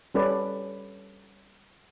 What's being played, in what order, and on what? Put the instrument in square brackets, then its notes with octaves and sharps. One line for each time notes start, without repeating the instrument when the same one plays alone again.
[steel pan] G3 C#4 A4 B4 D5